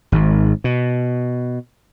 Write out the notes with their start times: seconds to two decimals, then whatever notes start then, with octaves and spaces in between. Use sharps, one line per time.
0.12 G#1 G#2
0.64 B2